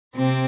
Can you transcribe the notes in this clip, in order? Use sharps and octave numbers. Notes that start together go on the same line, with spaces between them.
C3 C4